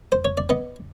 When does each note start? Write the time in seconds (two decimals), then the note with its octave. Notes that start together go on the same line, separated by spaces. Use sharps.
0.12 C5
0.25 C#5
0.37 D5
0.49 B3 D#5